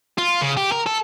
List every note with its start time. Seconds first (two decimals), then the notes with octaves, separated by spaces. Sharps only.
0.18 F4
0.41 C#3
0.57 G4
0.72 A#4
0.87 A4